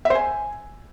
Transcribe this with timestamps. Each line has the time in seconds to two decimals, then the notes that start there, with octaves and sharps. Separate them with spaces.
0.05 E5
0.10 C5
0.15 G#5